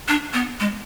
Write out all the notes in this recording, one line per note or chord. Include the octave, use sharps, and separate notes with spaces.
D4
B3
G#3